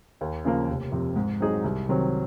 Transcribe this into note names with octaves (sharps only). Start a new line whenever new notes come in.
D#2
C#3 F3 A#3
F1
F2 C3
G#2
F#3 C4 D#4 G#4
C2
C3 D#3 F#3 C4